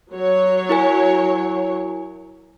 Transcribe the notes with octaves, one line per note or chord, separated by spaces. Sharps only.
F#3 C#5
E4 A#4 G#5